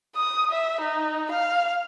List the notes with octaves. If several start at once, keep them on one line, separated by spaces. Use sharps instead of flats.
D#6
E5
D#4
F5